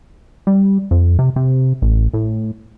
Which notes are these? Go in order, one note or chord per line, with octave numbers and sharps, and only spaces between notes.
G3
F2
C3
C3
A1
A2